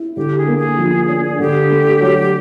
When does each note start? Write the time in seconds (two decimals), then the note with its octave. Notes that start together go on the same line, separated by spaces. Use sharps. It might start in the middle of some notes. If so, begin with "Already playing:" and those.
Already playing: E4
0.16 D3 G4
0.38 G#4
0.47 A#3
0.58 G#4
0.78 F3
1.08 D4
1.39 D3 G4
1.70 A3
2.01 F#3